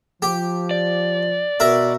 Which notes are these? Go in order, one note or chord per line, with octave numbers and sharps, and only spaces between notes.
F3 G4
D5
B2 F#4 A#4 E5